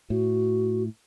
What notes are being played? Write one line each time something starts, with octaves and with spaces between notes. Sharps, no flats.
A2 F#4